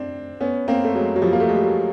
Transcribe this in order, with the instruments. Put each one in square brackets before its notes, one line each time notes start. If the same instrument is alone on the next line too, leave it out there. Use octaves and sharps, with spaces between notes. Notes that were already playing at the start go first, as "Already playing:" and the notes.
Already playing: [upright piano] C4 D4
B3 C#4
A#3 C4
A3
F#3 G#3
F#3
F3 G3
A#3
A3
G#3
G3
F#3